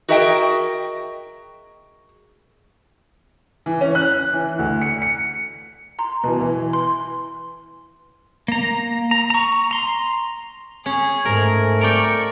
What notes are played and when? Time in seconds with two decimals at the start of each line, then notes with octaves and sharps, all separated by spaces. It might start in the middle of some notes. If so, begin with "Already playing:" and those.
0.09 F#4 G#4 A#4 D#5 E5 G5
3.66 E3
3.81 C#4
3.95 F#6
4.33 E3
4.59 D2
4.81 C#7
5.02 C#7
5.99 A#5 C6
6.24 B2 E3
6.41 E3
6.73 C6
8.48 A#3 A#5
9.11 A#5
9.30 A#5 C#6
9.71 A#5 C6
10.86 C#4 G#4
11.25 G#2 A3 A#4
11.81 A#4 D5 G5 C#6